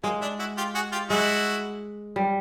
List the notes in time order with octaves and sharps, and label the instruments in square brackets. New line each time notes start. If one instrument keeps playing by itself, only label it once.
[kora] G#3 [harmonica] A#3
[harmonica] D4 E4
E4 F#4
F4 G4
F#4 G#4
F4 G4
[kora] G#3 [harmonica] E4 F#4
[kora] G3